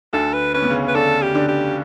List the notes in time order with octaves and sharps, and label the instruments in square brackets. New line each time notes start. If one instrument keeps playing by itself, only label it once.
[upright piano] D2 D3 [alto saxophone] A4
[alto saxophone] B4
[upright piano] C#4 [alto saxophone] B4
[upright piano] B3
C#3 C#4
[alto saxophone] B4
[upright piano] D3 D4 [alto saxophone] A4
[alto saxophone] G4
[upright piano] D3 D4
[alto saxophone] G4